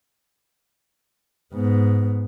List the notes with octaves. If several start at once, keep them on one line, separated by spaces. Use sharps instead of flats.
G#2 B3